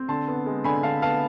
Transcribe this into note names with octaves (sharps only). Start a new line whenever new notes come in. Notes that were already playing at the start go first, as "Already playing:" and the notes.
Already playing: C4
D3 A5 C6
B3
G#3
D3 G#5 B5
D3 F5 A5
B3 F5 A5